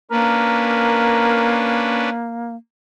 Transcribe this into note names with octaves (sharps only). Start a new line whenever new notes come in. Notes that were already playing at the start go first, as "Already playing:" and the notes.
A#3 C#4 D4 A#4 B4